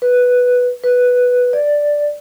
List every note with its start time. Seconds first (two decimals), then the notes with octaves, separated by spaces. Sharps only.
0.02 B4
0.84 B4
1.53 D5